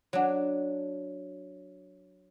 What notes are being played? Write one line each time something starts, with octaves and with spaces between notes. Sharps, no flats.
F#3 D4